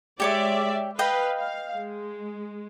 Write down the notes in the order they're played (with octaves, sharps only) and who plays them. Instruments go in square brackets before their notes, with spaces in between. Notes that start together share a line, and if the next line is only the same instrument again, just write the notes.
[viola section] G#3 D5 E5 [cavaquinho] G4 C#5 D6
[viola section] B4 F5 [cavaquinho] D#5 G5
[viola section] F5
G#3